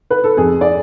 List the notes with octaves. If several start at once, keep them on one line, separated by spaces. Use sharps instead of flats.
B4
A4
F2 G#4
D5